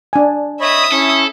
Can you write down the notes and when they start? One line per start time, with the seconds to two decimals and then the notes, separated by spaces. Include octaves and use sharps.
0.13 D4 G#5
0.60 C#5 D#5 E5 B5 D#6
0.92 C#4 E4 A4